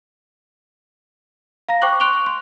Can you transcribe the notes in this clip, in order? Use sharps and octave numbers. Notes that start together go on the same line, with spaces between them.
F5 A#5 A#6
C5 G5 C#6 D6 F#6 F#7
C6 C#6 F#6 D7 F7 G7
C6